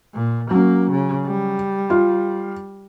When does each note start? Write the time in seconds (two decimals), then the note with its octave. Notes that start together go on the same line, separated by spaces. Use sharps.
0.14 A#2
0.51 F#3 A#3 C#4
0.91 C#3
1.26 G3
1.90 F4